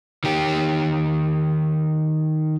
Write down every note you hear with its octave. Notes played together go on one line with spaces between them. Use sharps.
D#3 G4